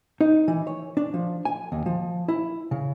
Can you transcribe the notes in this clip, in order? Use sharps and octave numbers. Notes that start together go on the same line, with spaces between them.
D#4
E3
C#5
D4
F3
G#5
D#2
F3
E4
C#3